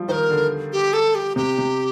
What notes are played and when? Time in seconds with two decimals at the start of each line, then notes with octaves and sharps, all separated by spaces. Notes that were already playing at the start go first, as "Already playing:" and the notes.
Already playing: F3 G3
0.08 D#3 A#4 C5
0.30 D3
0.72 G4
0.93 A4
1.15 G4
1.36 C3 G4
1.58 C3